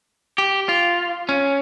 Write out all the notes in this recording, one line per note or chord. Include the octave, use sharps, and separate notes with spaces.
G4
F4
C#4